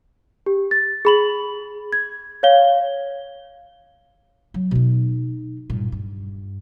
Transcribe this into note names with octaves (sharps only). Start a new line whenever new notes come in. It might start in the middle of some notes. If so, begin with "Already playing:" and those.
G4
A6
G#4 B5 F#7
G#6
C#5 F5 G7
F#3
B2 D#4
G2 A#2
G2